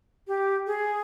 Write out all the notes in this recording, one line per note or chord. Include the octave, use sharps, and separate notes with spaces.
G4
G#4